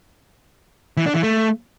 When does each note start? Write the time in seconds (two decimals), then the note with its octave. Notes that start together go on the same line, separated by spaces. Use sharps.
0.97 E3
1.06 D4
1.14 E3
1.23 A3